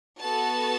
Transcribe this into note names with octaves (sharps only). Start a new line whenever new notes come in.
B3 F#4 A4 A5